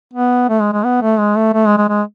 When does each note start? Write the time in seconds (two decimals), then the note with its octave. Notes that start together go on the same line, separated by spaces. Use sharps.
0.14 B3
0.49 A3
0.61 G#3
0.73 G#3
0.84 B3
1.02 A3
1.19 G#3
1.36 A3
1.54 A3
1.66 G#3
1.78 G#3
1.89 G#3